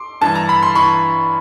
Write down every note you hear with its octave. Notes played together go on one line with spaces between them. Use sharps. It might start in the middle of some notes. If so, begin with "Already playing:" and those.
Already playing: C6 D6
G2 E3 A5
A#5
B5
C6
E3 B5 C#6